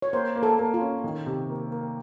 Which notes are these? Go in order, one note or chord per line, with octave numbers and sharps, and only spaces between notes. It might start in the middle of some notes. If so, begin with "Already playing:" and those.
C#5
A#3 C5
A#3
A4
A#3
F4
C#4
D#3
C3
A#3
A#3